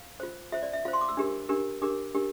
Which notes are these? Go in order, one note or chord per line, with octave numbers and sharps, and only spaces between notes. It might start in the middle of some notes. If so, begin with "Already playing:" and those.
Already playing: F5
F4 C5
F4 C5 E5
D5
E5
F4 C5 F5
C6
D6
E6
D4 G4 A#4
D4 G4 A#4
D4 G4 A#4 D6
D4 G4 A#4